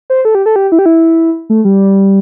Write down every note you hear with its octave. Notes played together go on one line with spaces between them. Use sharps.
C5
A4
G4
A4
G4
E4
G4
E4
A3
G3